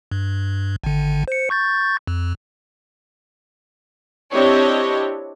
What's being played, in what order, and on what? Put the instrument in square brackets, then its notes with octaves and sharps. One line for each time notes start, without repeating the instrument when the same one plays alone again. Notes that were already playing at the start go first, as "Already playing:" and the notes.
[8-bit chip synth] G2
G#1 D3
C5 C#7
C#6 G6 A6
F2
[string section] C4 D4 E4 G4 C#5 D#5